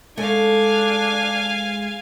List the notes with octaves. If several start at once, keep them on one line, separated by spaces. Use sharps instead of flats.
G#3 A3 D4 F5 G#5